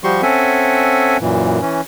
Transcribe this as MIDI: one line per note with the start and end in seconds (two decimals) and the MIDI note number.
0.04 0.22 53
0.04 0.22 55
0.04 0.22 66
0.04 0.22 67
0.04 0.22 84
0.04 0.22 85
0.23 1.17 60
0.23 1.17 61
0.23 1.17 69
0.23 1.17 76
0.23 1.17 78
0.23 1.17 80
1.21 1.60 42
1.21 1.60 46
1.21 1.60 52
1.61 1.81 52
1.61 1.81 61